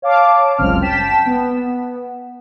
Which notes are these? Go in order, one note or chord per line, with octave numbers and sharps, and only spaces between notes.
C#5 F5 A5 D6
G1 C#2 F#2 C4 F6
G5 A5 B6 E7
B3